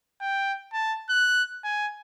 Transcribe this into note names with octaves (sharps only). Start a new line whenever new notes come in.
G5
A5
F#6
G#5